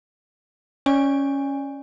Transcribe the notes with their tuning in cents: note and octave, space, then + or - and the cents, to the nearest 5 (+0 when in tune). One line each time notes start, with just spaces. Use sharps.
C#4 +0 D5 +15 G#5 -25